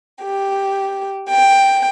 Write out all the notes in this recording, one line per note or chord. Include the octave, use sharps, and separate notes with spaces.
G4
G5